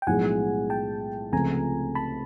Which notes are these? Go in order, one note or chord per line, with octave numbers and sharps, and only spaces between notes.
G5
B1 A2 F3 G#3 F#5 G#5
G5 A5
C#2 C3 F3 A3 C4 G#5 A#5
A5 B5